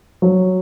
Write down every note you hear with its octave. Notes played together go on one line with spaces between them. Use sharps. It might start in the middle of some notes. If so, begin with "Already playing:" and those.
F#3